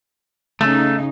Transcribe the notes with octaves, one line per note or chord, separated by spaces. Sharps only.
C#3 A3 D#4